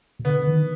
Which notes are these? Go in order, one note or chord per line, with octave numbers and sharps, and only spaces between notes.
B2
D3 B3
D#3